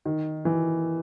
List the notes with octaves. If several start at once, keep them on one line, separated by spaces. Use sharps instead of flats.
D#3
E3